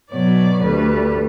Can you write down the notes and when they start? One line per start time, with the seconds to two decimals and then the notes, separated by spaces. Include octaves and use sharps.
0.11 B2 F#3 B3 D5
0.63 D2 D3 G3 B4